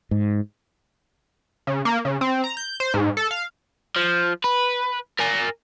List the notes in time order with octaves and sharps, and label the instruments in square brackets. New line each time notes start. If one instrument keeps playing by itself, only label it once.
[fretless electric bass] G#2
[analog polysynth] C#3
A#3
C#3
C4
A#5
G6
C5
G#2
A4
F5
[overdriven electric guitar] F3
B4
A#4 G#5